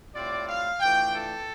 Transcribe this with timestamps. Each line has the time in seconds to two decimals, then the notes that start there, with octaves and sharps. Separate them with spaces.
0.15 A2 G3 C4 F4 D5
0.48 F5
0.80 E3 A3 D4 F4 G5
1.13 A4